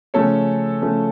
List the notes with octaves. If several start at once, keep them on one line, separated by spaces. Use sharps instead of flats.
C#3 F3 A3 C#4 A4 C#5
C#3 F3 A3 C#4